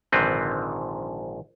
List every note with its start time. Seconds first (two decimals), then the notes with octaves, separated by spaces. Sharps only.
0.12 A#1 G#2 D3 D#3 C4 B4